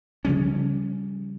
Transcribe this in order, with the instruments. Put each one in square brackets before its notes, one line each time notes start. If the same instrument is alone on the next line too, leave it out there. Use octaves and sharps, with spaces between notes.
[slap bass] C#3 F3 G3 C#4